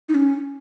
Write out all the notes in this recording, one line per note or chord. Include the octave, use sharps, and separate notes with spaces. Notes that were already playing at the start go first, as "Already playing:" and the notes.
D#4
C#4